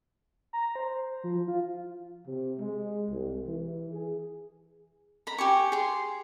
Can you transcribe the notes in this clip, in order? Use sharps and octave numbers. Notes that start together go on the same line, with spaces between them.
A#5
C5
F3
F4
C3
G#3
C2
E3
G#4
A#5 B5
G4 G#5 C#6
G#4 C6